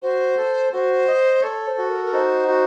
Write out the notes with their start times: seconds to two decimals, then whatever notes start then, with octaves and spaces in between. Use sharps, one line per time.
0.02 F#4 C5
0.37 A4
0.73 F#4 C5
1.08 D#5
1.42 A4 C#5
1.67 C5
1.78 F#4
1.89 A#4
2.05 A#4
2.13 D#4 C5
2.48 F#4